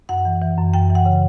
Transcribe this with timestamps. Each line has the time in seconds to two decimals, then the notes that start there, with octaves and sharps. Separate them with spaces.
0.09 F#2 F#5
0.25 E3
0.41 E3
0.58 F#2
0.74 F#2 G5
0.90 E3
0.95 F#5
1.06 C#3